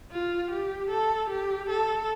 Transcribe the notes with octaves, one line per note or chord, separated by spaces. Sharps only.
F4
G4
A4
G4
A4